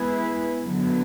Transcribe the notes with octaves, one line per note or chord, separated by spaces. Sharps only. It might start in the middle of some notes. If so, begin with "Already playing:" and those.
Already playing: G#3 B3 E4 G#4 B4
F#2 D3 F#3 B3